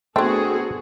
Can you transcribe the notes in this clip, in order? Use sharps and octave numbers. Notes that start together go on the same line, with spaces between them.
A3 B3 C4 D4 F#4 G#4 A4